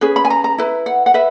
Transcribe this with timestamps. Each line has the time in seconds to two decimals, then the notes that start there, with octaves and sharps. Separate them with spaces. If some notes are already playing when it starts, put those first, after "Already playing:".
0.01 C#4 G#4 B4
0.16 B5
0.25 G#5
0.30 A#5
0.44 A#5
0.58 E4 B4
0.86 F#5
1.06 F#5
1.14 B4 E5